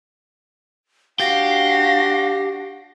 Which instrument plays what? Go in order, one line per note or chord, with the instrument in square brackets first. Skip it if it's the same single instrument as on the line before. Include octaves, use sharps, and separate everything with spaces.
[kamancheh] D4 F#4 [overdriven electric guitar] G4 [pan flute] F5 [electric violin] A#6 C7